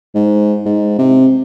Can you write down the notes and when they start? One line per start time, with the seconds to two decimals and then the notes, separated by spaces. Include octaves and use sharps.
0.15 G#2
0.66 G#2
0.99 C3